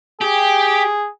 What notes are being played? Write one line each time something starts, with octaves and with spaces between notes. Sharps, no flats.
G4 G#4